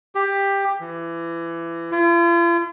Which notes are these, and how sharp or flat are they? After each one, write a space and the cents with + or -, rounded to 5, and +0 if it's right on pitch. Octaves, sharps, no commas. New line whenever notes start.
G4 +15
E3 +25
F4 -45